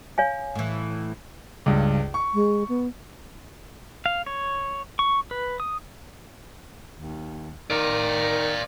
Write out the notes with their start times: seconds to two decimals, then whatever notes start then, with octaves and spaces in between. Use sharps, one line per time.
0.18 C#5 F5 G#5
0.55 A2 E3
1.66 C#2 G2
2.14 C#6
2.34 G#3
2.69 B3
4.06 F5
4.26 C#5
4.99 C#6
5.31 B4
5.60 D#6
6.96 D#2
7.71 D#3 D5 F5